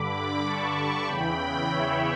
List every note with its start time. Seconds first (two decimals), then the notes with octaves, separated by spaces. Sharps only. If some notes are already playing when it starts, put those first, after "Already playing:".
Already playing: G2 D3 B5 D6
0.44 A5 C#6
1.06 E2 C#3 E3 G5 B5
1.69 C#5 E5